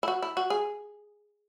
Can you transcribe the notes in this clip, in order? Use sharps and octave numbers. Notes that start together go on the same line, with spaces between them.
E4
F#4
E4
F#4
G#4